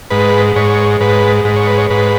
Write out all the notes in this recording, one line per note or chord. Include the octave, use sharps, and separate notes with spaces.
G#2 B4
G#2 C#5
G#2 B4
G#2
C#5
B4
C#5
G#2 B4